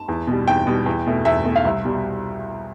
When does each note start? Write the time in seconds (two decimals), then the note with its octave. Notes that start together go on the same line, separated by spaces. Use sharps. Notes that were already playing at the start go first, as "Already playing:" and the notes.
Already playing: A5
0.08 E2
0.27 B2 G3
0.48 E2 G5
0.67 B2 G3
0.86 E2
1.07 B2 A3
1.25 E2 E5
1.45 B2 A3
1.56 F5
1.65 C2 E5
1.85 B2 G3